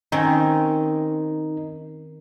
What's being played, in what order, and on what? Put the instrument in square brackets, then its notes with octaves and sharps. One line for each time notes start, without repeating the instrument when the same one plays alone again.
[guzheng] D#3 C4 C#4 [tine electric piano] D#4